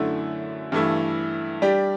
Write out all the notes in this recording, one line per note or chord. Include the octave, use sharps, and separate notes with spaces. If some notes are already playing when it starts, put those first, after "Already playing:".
Already playing: F#2 D3 A3 E4
G2 E3 A3 E4
G3 D4 G4